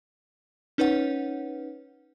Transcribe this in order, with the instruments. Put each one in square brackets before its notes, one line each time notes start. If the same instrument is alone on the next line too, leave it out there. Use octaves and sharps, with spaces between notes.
[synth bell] C#4 D#4 B4 C#5 F#5